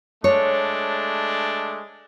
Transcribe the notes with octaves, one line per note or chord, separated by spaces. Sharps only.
G#3 A3 D4 C#5